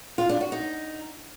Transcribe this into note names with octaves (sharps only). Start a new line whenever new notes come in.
F4
D4
F#4
D#4